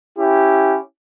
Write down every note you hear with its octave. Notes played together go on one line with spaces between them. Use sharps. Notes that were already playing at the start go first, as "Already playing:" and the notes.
C#4 E4 G4